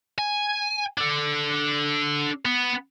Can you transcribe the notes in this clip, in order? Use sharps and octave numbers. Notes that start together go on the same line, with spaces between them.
G#5
D4 A4
B3